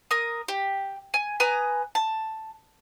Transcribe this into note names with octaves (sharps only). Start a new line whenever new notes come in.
A#4 D#6
G4
G#5
B4 G#5 A#5 D#6
A5